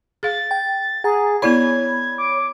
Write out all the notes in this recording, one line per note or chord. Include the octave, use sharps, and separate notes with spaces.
G#4 F5 A6
G5
G#4 F#5 A#5
B3 E4 C#5 D5 B5 G#6
D6